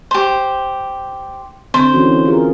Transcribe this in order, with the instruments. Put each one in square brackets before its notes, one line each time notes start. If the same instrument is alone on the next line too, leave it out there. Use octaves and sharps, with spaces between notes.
[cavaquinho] G4 C5
[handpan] D3 C4 [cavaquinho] C5
[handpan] E3 C#4 F#4
F4 G#4 A#4